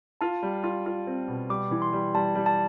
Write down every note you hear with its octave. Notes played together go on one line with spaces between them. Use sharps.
F4 A5
G3
F4
F4
C4
B2
G3 D6
E3
C6
G3
G3 A5
G3
A5